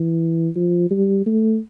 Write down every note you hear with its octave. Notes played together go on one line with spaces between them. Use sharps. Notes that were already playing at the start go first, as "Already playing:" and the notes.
Already playing: E3
F3
G3
A3